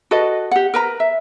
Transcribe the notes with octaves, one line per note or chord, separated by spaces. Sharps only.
F#4 A4 B4 D#5
G4 F#5
A#4 B4 A#5
E5